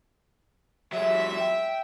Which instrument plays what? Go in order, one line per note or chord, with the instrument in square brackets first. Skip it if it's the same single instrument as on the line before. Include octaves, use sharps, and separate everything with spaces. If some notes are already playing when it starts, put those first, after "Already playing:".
[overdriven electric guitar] F#3 G#3 [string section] E5
[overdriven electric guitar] G5